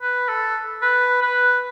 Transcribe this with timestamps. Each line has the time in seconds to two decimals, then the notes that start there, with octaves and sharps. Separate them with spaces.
0.02 B4
0.29 A4
0.82 B4
1.22 B4